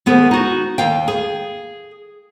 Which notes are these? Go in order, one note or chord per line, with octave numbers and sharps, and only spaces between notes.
D#2 B3 G#4 A#4 C5
D#4 F#4
D#2 F5 G5
G#4